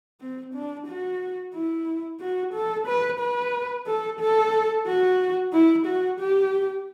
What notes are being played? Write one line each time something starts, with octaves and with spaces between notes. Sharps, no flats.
C4
D4
F#4
E4
F#4
A4
B4
B4
A4
A4
F#4
E4
F#4
G4